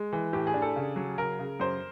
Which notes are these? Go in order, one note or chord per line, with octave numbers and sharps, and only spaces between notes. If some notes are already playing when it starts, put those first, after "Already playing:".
Already playing: G#3
E3
A2 G4
G#4
D4
A4
C#3
F#3
C#3 A#4
C#3
F#2 C5